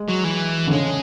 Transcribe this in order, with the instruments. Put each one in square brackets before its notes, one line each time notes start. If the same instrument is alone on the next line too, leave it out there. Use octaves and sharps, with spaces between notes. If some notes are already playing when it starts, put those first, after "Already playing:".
Already playing: [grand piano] G#3
[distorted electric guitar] F#3
E3
[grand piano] D3
[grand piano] C#3 [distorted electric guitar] G#3